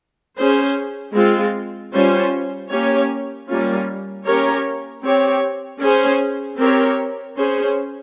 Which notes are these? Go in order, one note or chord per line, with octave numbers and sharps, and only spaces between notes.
C#4 G#4 C5
G#3 C4 F4
G3 C#4 F4 C5
A#3 C#4 G4 C#5
G3 A#3 C#4 F4
A#3 C#4 G4 A#4 C#5
C4 G4 C#5
C#4 G#4 C5
C4 G4 A#4 C#5
C#4 G#4 C5